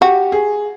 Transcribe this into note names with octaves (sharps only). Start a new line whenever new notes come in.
F#4 G4
G#4